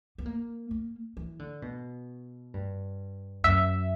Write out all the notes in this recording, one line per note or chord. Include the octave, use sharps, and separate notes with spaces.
B3
A#3
A#3
E3
D3
B2
G2
F#2 E5